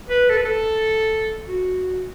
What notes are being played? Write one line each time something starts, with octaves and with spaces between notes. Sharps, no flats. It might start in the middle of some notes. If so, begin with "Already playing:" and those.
B4
A4
B4
A4
F#4